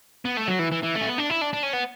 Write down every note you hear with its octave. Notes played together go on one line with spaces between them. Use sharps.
B3
A3
F#3
E3
E3
E3
A3
C#4
B3
D4
E4
D4
D4
C#4
B3